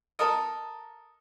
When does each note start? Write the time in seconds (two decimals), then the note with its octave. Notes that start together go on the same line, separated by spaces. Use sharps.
0.19 A4 A#4 D#5